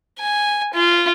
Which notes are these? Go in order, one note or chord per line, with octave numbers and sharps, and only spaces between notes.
G#5
F4